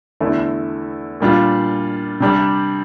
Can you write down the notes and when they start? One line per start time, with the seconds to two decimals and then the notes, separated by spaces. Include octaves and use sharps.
0.21 E2 D3 A3 E4
1.20 A#2 G3 D4 F4
2.20 C3 G3 D4